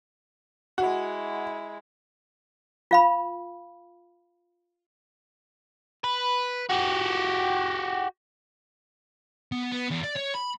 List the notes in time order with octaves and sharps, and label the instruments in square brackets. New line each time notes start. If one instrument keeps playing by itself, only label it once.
[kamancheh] G#3 E4 [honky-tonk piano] F#4
[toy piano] F4 F5 B5
[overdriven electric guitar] B4
F#4 G4
[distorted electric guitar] B3
B3
E2
D5
C#5
B5